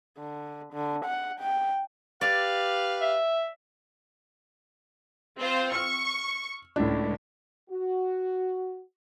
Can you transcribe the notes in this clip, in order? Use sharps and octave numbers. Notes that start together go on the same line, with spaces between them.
D3
D3
F#5
G5
G4 B4 D5 F5
E5
C4 F4 C5
C#6 E6 F6
C#2 A2 D4
F#4